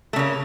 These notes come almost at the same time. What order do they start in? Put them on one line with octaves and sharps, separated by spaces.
A3 C#3 A#3